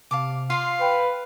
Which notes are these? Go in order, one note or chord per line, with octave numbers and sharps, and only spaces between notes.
C3 F5 A5 D6
F4 F5 C6
B4 G5